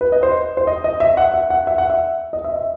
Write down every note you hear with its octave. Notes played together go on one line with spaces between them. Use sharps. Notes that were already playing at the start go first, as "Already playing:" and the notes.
B4
D#5
C5
C5
D#5
D#5
E5
F#5
E5
F#5
E5
F#5
E5
D#5
E5
E5